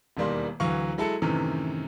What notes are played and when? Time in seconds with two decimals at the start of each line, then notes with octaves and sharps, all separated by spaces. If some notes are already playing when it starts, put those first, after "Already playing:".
0.17 E1 D#2 D#3 G3 A#3 C6
0.60 D2 E3 F#3 F5 C#6
0.98 F#3 G#3 E4 A4 A5 C#7
1.22 F#2 A2 C3 D#3 E3